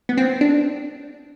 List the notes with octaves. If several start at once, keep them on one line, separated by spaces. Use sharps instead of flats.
B3
C4
D4